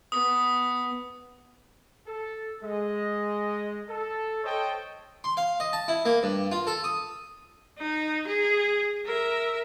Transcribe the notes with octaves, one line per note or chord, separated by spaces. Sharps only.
B3 D#6
A4
G#3 D#5
A4
A4 C5 C#5 D#5 G5 A5
C6
F5
D#5
A5
E4
A#3
G2
F4
A4
D#6
D#4
G#4
A#4 E5